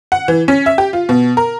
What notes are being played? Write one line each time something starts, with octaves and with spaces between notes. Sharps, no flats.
F#5
E3
C#4
E5
G4
F4
B2
A#4